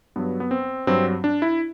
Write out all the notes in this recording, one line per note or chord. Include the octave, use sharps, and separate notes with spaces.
G2 F#3 B3
B3
C4
G2 F#3 C4
D4
E4